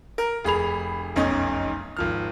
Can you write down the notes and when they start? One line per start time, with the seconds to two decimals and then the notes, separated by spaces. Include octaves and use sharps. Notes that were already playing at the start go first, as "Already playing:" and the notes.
0.18 A#4
0.45 F1 G#4 B5 F7
1.16 F1 B1 F#2 C#4 D#4
1.97 G#1 F3 F6